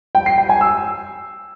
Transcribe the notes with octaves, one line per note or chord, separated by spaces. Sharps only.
G5
C7
G5
G#5
E6